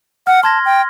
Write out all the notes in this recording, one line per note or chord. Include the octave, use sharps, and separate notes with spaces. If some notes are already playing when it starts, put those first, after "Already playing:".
F#5 F6
A5 C6 G#6 A#6
G5